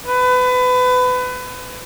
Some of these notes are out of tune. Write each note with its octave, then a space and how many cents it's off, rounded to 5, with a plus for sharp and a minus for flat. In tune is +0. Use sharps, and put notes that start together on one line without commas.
B4 +25